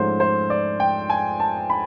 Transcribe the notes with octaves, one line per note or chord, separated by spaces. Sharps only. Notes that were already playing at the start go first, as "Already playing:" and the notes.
Already playing: G#2 F3 A3 C#4 C5
C5
D5
G5
G#5
A5
B5